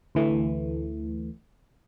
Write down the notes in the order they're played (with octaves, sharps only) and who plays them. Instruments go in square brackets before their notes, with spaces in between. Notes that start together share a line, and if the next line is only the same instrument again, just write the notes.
[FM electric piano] D2 E3 A3